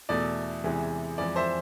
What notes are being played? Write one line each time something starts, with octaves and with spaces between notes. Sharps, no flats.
E2 B2 A3 D5
E2 C3 E3 G#3
F2 E3 G#3 D5
C5 E5